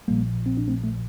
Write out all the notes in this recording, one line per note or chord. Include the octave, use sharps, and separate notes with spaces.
A#1 A#2 F3 G3 A#3
C4
D4
A3 C4
A3